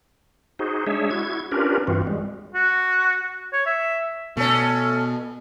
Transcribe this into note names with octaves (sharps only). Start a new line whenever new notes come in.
D#4 F#4 G#4 C5
G#3 D4 G#4 C#5 E5
E4 F#4 G#6
C#4 D4 F4 G4 A#4 B4
G2 E3 C4 F4 F#4
G3 G#3
F#4
C#5
E5
B2 A3 C#4